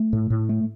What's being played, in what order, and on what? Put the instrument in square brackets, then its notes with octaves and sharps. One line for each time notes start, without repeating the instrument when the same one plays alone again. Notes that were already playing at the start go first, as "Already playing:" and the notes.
Already playing: [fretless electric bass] A3
A2
A2
A3